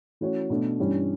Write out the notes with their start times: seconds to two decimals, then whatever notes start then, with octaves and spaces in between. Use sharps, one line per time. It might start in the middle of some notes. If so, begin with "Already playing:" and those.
0.21 E3 A3 C#4 F#4 C#5
0.50 B2 A3 D4
0.79 G2 E3 G3 C#4